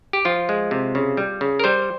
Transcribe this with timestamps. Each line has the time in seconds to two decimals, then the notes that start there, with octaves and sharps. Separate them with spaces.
0.13 G4
0.25 F3 F4
0.49 G#3
0.71 C3
0.95 C#3
1.17 G3
1.41 C#3
1.59 A#4
1.64 G3 C5